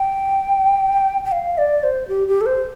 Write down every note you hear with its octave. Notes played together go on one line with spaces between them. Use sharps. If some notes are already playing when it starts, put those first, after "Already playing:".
Already playing: G5
G5
F5
D5
C5
G4
G4
A4
C5